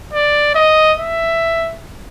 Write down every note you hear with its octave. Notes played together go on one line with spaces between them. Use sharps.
D5
D#5
E5